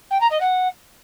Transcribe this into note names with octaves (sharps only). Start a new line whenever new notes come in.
G5
A#5
D#5
F#5